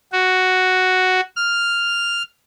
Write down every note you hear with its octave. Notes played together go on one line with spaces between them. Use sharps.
F#4
F6